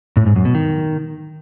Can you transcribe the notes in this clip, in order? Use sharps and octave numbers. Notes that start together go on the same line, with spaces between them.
A2
G#2
F#2
B2
D#3